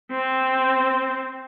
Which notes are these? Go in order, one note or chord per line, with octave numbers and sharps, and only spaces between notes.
C4